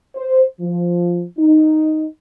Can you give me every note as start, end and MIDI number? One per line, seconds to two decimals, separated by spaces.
0.15 0.43 72
0.60 1.22 53
1.38 2.04 63